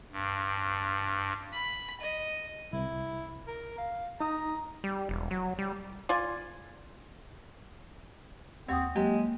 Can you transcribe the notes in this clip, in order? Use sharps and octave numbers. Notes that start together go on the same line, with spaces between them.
G2
B5
D#5
C2 E4
A#4
F5
D#4 A#5 D#6
G3
E1
F#3
G3
F4 D5 G#5
D#2 C4 C#5 F#5 G5 D#6
F#3 G#3 A#3 G4